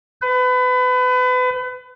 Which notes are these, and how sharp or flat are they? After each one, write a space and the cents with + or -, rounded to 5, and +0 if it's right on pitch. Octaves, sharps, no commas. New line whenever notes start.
B4 +30